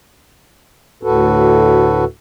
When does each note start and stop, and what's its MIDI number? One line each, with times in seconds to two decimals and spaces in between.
1.03 2.05 38
1.03 2.05 45
1.03 2.05 66
1.03 2.05 69
1.03 2.05 71